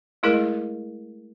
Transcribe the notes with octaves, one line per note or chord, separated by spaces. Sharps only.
G#3 A3 E4 G#4 A#4 D#5